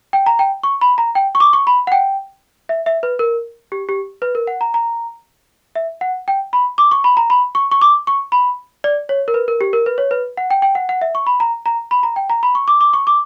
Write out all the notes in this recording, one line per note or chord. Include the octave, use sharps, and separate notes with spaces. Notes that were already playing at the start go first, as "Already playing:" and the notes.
G5
A#5
G5
C#6
B5
A#5
G5
C#6
D6
C#6
B5
F#5
G5
E5
E5
B4
A#4
G4
G4
B4
A#4
F#5
A#5
A#5
E5
F#5
G5
B5
D6
C#6
B5
A#5
B5
C#6
C#6
D6
C#6
B5
D5
C#5
A#4
B4
A#4
G4
A#4
B4
C#5
B4
F#5
G5
G5
F#5
F#5
E5
C#6
B5
A#5
A#5
B5
A#5
G5
A#5
B5
C#6
D6
D6
C#6
D6